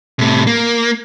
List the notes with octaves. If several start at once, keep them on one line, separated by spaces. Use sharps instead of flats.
A2 C3
A#3